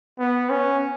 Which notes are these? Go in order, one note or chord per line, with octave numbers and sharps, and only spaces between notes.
B3
C#4